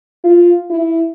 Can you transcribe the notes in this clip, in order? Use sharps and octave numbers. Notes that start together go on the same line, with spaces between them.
F4
E4